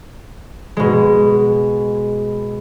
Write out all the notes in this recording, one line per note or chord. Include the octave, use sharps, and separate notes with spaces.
B2 G#3